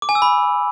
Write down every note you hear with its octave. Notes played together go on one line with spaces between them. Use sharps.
D6
G#5
E6
B5